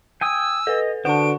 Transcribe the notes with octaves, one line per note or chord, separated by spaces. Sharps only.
G5 G#5 D#6 E6 D#7
A4 B4 D#5
D3 F#4 B4 C5 F#5 A5 D7